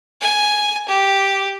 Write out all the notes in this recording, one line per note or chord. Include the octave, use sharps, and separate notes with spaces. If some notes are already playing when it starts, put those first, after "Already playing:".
G#5
G4